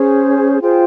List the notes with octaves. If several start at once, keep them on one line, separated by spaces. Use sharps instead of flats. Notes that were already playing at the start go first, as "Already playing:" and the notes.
Already playing: C#4 G#4 C5
F4 G#4 C5 G5